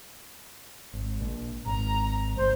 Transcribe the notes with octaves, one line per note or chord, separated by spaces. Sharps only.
G#1
A#1
G#1 A#5
D1 G#1 C5